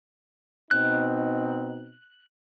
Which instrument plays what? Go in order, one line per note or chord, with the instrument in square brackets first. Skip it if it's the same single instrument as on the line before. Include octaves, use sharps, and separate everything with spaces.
[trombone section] B2 C4 D#4 [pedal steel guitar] F#6